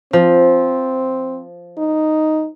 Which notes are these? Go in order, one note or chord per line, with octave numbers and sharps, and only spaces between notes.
F3 C4
D#4